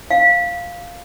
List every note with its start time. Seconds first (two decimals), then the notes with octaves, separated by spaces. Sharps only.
0.10 F5